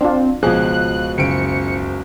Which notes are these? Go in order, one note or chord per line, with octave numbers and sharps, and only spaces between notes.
C4 D4 F4
C#2 B2 F3 G#4 F#6
F#1 C#7 D7